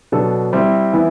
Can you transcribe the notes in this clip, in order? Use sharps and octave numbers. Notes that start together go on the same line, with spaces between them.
B2 F#3 B3 D4 A4
G3 C4 E4
E3 B3 E4